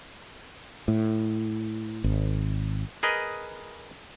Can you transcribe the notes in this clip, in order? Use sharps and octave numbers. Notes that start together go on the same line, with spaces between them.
A2
G#1
G#4 A#4 B4 D#5